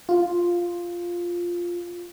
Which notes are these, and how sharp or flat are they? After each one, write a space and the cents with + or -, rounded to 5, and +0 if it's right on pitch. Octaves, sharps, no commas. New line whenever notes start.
F4 +0